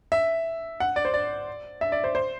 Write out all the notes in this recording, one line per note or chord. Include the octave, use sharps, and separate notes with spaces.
E5
F#5
D5
C5
D5
E5
D5
C5
C5